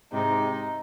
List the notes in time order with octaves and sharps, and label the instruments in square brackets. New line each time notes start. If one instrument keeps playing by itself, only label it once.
[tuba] G#2 [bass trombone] C3 [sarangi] D#4